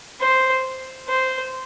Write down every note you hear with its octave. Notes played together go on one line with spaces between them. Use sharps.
C5
C5